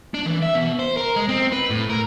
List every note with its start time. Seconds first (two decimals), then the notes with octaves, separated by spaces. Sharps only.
0.15 D4
0.26 E3
0.43 E5
0.55 B2
0.80 C5
0.97 A#4
1.16 G#3
1.29 C4
1.52 B4
1.70 A2
1.90 A#4